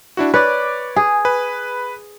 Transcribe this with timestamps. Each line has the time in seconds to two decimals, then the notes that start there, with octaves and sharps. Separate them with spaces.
0.17 D4 E4 F#4
0.34 B4 C#5 D5 D6
0.96 G#4
1.25 B4